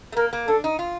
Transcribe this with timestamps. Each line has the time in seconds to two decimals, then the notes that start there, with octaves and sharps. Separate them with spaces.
0.12 A3
0.17 A#3 A#4
0.33 A#3
0.48 D4 A4
0.64 D#4
0.79 F4